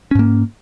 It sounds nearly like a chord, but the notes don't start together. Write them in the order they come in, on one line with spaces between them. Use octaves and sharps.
C#4 G#2 A#3